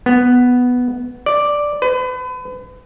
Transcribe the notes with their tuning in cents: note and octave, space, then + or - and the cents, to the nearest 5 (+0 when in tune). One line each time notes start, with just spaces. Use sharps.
B3 +0
D5 +0
B4 +35